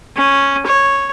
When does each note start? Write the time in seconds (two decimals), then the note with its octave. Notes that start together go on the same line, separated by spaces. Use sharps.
0.16 C#4
0.66 C#5